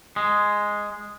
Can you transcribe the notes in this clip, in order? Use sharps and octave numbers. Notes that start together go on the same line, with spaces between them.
G#3